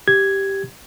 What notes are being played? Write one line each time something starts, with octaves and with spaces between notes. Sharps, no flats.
G4 G#6